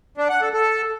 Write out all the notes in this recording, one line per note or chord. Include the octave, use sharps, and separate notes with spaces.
D4
F#5
A4
A4